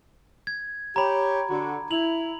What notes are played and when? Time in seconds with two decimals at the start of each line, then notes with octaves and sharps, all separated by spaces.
0.47 G#6
0.96 G4 C#5 A#5 B5
1.50 D3 F#4
1.91 E4 F7 F#7